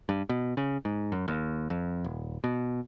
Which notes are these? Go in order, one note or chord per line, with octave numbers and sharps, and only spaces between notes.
G2
B2
C#3
G#2
F#2
D#2
F2
D#1
B2